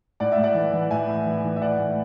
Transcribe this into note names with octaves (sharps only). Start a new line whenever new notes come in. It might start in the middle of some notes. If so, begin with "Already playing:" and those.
A2 D5 F#5
E5
A2
D5 F#5
E3
E3
A2 E5 G#5
A2
E3
E3
E5
A2 D5 F#5
A2